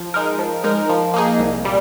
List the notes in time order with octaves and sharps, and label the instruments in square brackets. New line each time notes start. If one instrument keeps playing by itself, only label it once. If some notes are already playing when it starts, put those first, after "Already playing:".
Already playing: [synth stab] F3
G#3 D#4 A#4
F3
G#3 D#4 A#4
F3
A#3 D#4 G#4
C2
A#2 G3